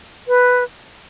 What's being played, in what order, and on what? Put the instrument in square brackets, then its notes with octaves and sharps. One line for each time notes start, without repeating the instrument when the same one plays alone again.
[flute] B4